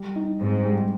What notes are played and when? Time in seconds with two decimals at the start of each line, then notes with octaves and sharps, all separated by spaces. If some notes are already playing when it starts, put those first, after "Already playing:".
Already playing: G3
0.16 D#4
0.40 G#2 C4
0.64 G3